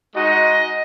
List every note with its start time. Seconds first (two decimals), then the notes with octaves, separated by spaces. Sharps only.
0.14 G#3 D#4 F#4 D#5